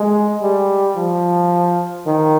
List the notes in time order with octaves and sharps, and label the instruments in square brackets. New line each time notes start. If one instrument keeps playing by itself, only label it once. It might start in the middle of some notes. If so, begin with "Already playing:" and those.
Already playing: [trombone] G#3
G3
F3
D#3